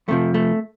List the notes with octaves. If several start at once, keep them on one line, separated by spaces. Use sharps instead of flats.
F2 C3 F3 A3
A3